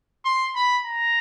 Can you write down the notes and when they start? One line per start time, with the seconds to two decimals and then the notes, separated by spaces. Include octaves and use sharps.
0.25 C6
0.55 B5
0.86 A#5